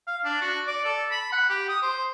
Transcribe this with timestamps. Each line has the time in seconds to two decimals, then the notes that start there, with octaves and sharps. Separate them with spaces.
0.07 F5
0.24 D4
0.41 F#4
0.67 D5
0.84 A4
1.11 B5
1.32 F#5
1.49 G4
1.68 D#6
1.82 C5